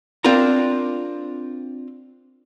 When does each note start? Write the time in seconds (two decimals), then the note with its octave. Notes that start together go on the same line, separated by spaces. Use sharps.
0.24 C4 D4 F4 A#4 A#5